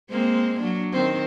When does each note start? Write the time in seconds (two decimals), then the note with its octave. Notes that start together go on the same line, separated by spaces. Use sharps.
0.11 G#3 A#3 C4
0.60 F#3 D4
0.92 D#3 C4